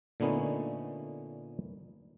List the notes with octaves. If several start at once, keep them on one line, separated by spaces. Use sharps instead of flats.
A#2 D3 A3 B3 C#4 D#4